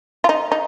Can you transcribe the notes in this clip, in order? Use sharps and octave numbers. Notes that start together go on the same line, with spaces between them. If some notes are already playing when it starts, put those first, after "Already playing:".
F4
D#4
D#4